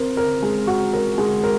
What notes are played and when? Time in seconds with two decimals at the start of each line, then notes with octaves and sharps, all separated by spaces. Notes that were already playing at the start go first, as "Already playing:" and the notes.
Already playing: C4 A#4
0.17 A#4
0.43 G#3
0.67 F#4
0.93 A#4
1.18 G#3
1.44 A#4